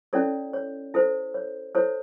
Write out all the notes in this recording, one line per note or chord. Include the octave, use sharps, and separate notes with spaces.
C#4 E4 A4 C#5 D5
C#5
E4 A4 C5
C#5
E4 A4 C5 C#5